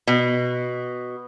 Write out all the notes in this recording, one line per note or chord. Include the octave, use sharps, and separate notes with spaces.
B2